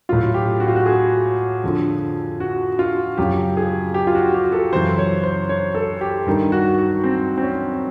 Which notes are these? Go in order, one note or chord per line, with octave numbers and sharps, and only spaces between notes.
A2 F#3 F4
G4
F#4
F4
F#4
G#4
F2 D3 F3
F#4
F4
F#2 C#3 F3 G4
G#4
G4
F4
F#4
G4
A4
F#2 C#3 E3 C5
C#5
C5
C#5
A4
G4
G2 D#3 G3
F#4
F#4
C4
C4
C#4